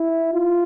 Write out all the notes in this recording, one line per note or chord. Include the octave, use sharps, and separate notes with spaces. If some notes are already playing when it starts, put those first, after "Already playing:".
Already playing: E4
F4